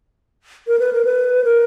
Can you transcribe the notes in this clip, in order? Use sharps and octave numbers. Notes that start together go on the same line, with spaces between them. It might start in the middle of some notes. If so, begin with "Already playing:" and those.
A#4
B4
A#4
B4
A#4